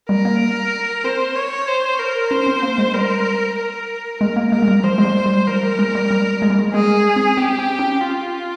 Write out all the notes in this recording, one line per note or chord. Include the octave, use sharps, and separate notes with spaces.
G3 A#4
A#3
C4 C5
C#5
C5
A#4
C#4 C5
C4
A#3
G#3
G3 A#4
A#4
G#3 A#4
A#3
G#3 A#4
G#3
G3
F3 C5
G#3
G3
G3
F3 A#4
G3
G#3
G3
G3
G#3
G3
G#3
G#3 G#4
C4
C4 G4
C4
C#4
F4